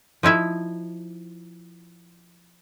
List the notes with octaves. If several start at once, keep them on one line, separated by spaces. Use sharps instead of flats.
F3 D#4 E4 E5